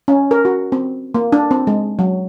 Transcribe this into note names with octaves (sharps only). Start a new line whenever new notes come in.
C#4
A#4
F#4
C4
A#3
D4
C4
G#3
F#3